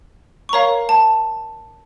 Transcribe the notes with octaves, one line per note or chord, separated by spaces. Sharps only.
C#6
A#4 C#5 F5 A#5
A5